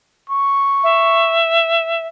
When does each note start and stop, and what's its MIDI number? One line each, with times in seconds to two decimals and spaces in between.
0.29 1.41 85
0.83 2.06 76